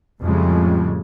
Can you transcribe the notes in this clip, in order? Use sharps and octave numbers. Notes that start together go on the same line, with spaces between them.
F2 A2 C#3 G3 G#3